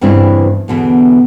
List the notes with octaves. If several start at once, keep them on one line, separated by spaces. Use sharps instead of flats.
E2 G2 C#3 C4 D4 E4
E2 B2 D3